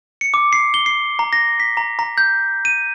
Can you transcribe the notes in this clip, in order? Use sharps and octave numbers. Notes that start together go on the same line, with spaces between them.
C#7
D6
C7
G7
C7
A#5
A#6
B6
A#5
A#5
G6
D#7